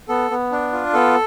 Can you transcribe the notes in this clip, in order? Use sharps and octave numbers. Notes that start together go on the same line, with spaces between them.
B3 A4
B3
D4
F4
B3 A4